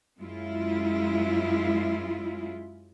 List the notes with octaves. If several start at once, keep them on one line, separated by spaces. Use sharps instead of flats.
F#2 G#3 E4 F4